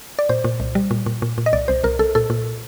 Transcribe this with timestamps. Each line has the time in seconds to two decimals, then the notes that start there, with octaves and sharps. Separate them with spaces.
0.19 D5
0.29 A#2 C5
0.44 A#2
0.60 C2
0.75 G3
0.91 A#2
1.06 A#2
1.22 A#2
1.38 A#2
1.46 D#5
1.53 C2 D5
1.68 C2 C5
1.84 C2 A#4
1.99 C2 A4
2.15 A#2 A4
2.30 A#2